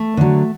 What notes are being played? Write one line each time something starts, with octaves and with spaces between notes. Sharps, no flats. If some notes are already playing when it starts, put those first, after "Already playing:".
Already playing: A3
D3 F#3